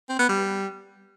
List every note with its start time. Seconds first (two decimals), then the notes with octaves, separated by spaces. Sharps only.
0.09 C4
0.19 B3
0.29 G3